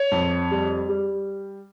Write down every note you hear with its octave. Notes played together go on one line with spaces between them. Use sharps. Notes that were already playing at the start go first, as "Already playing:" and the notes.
Already playing: C#5
F2
G3
G3